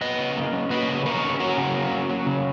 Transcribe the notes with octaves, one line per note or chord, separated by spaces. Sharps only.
F#3 B4 D#5
C#3
A#3
C#4
F#3 B4 D#5
C#3
A#3 A#4 C#5
C#4
F#3 F#4 A#4
C#3
A#3
C#4
F#3
C#3